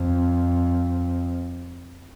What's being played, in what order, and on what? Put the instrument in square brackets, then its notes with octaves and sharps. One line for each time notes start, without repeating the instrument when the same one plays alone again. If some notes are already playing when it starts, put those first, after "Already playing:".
Already playing: [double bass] F2